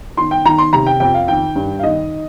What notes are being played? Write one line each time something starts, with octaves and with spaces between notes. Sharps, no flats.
D#3 C6
G5
D#3 A#5
C6
C3 A#5
G5
F2 G5
F5
D#3 G5
G2
F5
D#3 D#5